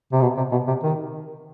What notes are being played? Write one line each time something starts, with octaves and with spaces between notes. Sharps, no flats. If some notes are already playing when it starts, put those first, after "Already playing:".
C3
B2
C3
B2
C3
D#3